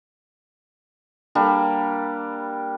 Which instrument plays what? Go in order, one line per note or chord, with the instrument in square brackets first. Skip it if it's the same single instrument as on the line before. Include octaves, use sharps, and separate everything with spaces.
[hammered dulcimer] G3 A#3 D4